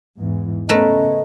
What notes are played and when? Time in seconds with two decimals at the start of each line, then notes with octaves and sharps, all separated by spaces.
0.18 E2 G#2 E3
0.69 C#3 A3 B3 C#4 A#4 B4 D#5